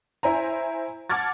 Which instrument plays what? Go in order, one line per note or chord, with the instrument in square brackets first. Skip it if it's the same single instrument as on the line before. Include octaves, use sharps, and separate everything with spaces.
[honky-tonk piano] E4 C5 G#5 A#5
F#5 A5 D6 F6 G#6 A6